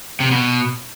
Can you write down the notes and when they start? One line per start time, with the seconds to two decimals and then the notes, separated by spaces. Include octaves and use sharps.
0.20 C3
0.31 B2